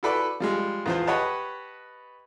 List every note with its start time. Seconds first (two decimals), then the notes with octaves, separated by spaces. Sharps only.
0.03 E4 F#4 A4 B4 D5
0.40 F3 G3 G#3
0.86 E2 F3 C5
1.07 G4 B4 C#5 D#5 F#5 A5